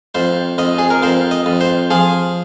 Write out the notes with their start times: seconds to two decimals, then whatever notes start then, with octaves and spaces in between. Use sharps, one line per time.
0.15 F2 C5
0.58 F2 D#5
0.78 G#4
0.90 A#4
1.03 F2 C5
1.31 D#5
1.46 F2
1.61 C5
1.90 F3 G#4